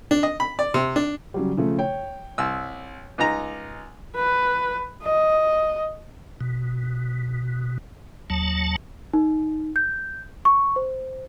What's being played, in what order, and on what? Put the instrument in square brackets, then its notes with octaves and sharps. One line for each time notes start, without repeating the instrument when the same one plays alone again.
[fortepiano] D4
D#5
B5
D5
C3
D4
[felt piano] C#3 F#3 G3
C#3 F3 A3
C#5 G5
[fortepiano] C2 E6
C#2 D#4 A#5
[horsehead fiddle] B4
D#5
[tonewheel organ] B2
D#2 F#3 A5
[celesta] D#4
G6
C#6
C5